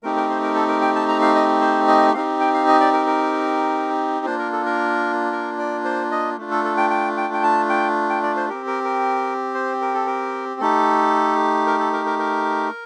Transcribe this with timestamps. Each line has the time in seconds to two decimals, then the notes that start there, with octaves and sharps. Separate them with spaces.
0.03 A3 C4 D#4 G4 A#4
0.16 A#4
0.29 C5
0.43 A#4
0.55 A4
0.68 A#4
0.81 G5
0.95 A5
1.08 A#5
1.21 F5
1.35 D#5
1.61 C5
1.88 D#5
2.14 C4 D#4 G4 F5
2.40 G5
2.54 F5
2.68 D#5
2.81 D5
2.93 A#4
3.07 A#4
4.26 A#3 D4 F4 C5
4.39 A#4
4.53 A4
4.66 A#4
5.32 A#4
5.58 D5
5.84 C5
6.11 D#5
6.38 A3 D4 F4
6.51 A4
6.64 A4
6.77 G5
6.90 G5
7.17 G5
7.34 G5
7.43 A5
7.69 G5
8.10 G5
8.23 D5
8.36 C5
8.49 C4 G4 A#4
8.67 A#4
8.84 A#4
9.55 C5
9.81 A#4
9.94 A4
10.07 A#4
10.61 A3 D#4 G4 A4
11.67 A#4
11.80 A4
11.93 A#4
12.06 A#4
12.19 A#4